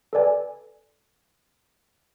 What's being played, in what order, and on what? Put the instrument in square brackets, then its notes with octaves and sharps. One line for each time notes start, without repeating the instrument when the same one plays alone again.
[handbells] A4 B4 D5 G#5